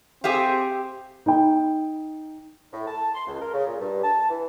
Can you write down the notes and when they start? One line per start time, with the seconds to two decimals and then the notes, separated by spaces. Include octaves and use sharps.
0.24 C4 G4 G#4 E5 F5
1.26 D#4 G5
2.73 A2
2.87 A5
3.15 C6
3.28 C#2
3.41 A#4
3.54 C#3
3.67 A#2
3.80 G2
4.04 A5
4.30 E3